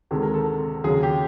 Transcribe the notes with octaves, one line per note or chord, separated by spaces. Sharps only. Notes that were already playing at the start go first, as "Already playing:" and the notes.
D2 C3 D#3 G#3 A4
A#4
A4
D#2 C#3 F#3 G#4
G4